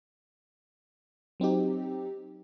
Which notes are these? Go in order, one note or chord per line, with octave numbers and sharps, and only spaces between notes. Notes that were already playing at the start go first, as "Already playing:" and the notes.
F#3 C4 D#4 G4